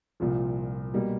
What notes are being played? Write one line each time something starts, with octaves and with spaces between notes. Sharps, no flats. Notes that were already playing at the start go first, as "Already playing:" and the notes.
C2 A#2 F3
B2 G3 A#3